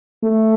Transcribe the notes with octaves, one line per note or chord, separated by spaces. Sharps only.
A3